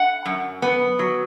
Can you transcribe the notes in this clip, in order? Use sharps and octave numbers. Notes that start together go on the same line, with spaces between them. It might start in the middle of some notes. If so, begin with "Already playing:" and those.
Already playing: F#5
F#2
B3
F#3